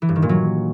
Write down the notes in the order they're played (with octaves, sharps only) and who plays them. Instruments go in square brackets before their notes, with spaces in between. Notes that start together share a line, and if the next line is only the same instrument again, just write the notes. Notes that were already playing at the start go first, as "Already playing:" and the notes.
[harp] E3
G2
D#3
A#2
F#3